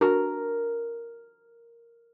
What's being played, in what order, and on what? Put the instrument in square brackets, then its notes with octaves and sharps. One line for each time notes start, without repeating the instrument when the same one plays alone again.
[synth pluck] D4 F#4 [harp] A#4